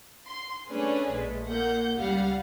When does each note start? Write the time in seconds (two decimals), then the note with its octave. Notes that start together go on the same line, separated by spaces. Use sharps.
0.26 C6
0.69 A3 C#4 D4 G#4 B4 D5
1.12 A#1 G#3 A3
1.45 A#2 A#3 F#5 G6
1.94 C#2 G3 F5 F#5